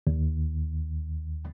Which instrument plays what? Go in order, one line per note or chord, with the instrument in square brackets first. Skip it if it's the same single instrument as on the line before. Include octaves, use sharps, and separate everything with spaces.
[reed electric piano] D#2